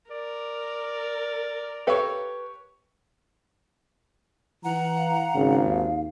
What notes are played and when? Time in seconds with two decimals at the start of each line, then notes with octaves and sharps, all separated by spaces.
0.11 A#4 D5
1.87 G4 A4 B4 C#5 F5
4.64 E3 F#5 A#5
4.97 F5
5.34 G#1 C#3
5.64 D#2